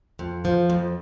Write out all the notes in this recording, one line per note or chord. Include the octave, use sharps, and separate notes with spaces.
F2
F3
F2